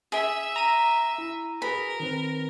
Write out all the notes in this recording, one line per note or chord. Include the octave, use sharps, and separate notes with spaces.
G#4 E5
A#5 D#7
E4
F#4 G#4 A#4 B4 B5
D#3 C4 B4